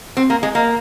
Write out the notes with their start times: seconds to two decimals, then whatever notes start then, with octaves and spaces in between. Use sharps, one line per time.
0.17 C4
0.30 A#3
0.43 G#3
0.55 A#3